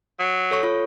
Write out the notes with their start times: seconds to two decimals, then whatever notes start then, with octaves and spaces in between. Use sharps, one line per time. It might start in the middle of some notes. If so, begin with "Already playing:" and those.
0.20 F#3
0.51 A4 C#5 C#6
0.63 F4 A4 C#5